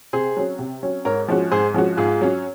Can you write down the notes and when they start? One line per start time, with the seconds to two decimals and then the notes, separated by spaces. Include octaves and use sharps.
0.13 C3 G#4 C5
0.37 F#3 C#4
0.59 C3
0.83 F#3 C#4
1.05 G#2 A#4 C#5
1.28 F3 G#3 C#4 F#4
1.52 G#2 G#4 C5
1.74 F3 G#3 C#4 F#4
1.97 G#2 F4 G#4
2.21 F#3 C#4